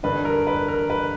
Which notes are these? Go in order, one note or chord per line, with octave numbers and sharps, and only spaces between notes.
G2 D3 B4
A#4
B4
A#4
B4